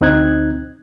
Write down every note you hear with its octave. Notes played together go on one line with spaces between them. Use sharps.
D2 C4 D#4 F#6 G#6